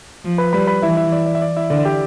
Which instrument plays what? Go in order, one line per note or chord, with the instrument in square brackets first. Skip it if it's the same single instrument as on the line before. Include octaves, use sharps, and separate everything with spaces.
[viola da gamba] F3
[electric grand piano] B4 B5
[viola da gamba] G3 [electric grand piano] B4 B5
[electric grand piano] B4 B5
[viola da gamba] E3 [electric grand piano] E4 E5
[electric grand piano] E4 E5
D5
D5
E5
D5
E4 E5
[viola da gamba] D3 [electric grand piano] D5
[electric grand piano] G4 G5